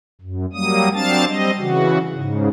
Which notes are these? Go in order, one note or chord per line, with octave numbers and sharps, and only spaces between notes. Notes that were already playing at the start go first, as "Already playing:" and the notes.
F#2
F#3 G3 A#3 D#6
F#3 C4 D4 F5 A5 A6
G3 C4 D#5
C#3 E3 F#4
G#2 C#3